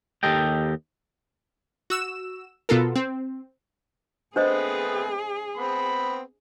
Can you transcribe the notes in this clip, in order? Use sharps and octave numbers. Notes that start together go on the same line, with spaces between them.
D#2 G4 A4 D#5 G5
F#4 E6 E7
B2 B3 F4 A4 A#4
C4
A3 B3 C4 D4 G#4 B4 C5 D#5
B3 C4 B5